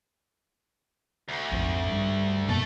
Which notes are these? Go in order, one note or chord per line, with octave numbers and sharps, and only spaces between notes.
D2
A#1 F2 G#2
G2 G3
F#2 B2 A3 A#3 A5